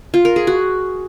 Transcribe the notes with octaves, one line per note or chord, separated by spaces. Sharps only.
F4
A#4
G#4
F#4